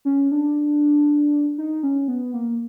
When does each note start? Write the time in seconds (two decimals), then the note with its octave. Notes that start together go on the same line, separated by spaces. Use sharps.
0.05 C#4
0.31 D4
1.58 D#4
1.83 C#4
2.08 B3
2.33 A#3